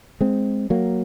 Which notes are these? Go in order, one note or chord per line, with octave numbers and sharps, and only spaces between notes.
G#3 C4
F#3 A#3